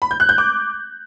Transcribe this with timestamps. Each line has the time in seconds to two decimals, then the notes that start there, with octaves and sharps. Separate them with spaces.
0.02 B5
0.11 G6
0.20 F#6
0.29 G6
0.38 D6